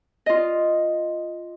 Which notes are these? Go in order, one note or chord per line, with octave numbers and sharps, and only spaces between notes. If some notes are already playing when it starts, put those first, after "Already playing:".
F4 D#5